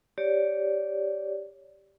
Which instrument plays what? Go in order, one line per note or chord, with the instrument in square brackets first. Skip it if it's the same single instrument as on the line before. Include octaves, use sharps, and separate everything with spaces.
[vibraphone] G4 C#5 D5